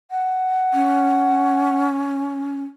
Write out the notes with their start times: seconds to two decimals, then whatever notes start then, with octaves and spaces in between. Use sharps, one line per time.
0.11 F#5
0.74 C#4